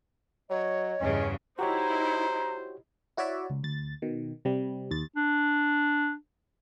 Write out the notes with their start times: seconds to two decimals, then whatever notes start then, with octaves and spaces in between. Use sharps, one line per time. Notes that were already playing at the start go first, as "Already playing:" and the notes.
0.50 F#3 C#5 D#5
1.00 E2 G2 C#3 C#4
1.59 D#4 E4 F#4 G4 C5 C#5 A#5
3.17 E4 F#4 C#5 D5 E5
3.50 C#2
3.63 D2 A6
4.02 B2 D#3
4.45 C3 G3
4.91 D#2 A6
5.16 D4